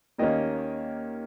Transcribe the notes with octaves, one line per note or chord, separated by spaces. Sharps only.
D#2 D#3 A#3 C#4 D#5